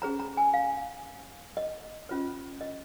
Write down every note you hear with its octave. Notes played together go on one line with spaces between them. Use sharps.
C#4 G#4 C5 A#5
A#5
G#5
F5
D#5
C#4 F4 C5
D#5